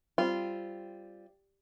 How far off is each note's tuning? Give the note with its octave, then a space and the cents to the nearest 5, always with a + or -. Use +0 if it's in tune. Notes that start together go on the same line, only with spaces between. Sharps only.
G3 +0 C4 +0 F4 -15